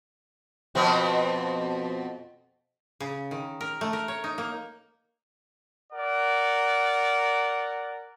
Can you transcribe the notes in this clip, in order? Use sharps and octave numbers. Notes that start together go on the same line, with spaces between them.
F2 B2 C4
C#3
D#3
A#4
A3
A#4
C#5
D#4
A#3
A#4 D5 F#5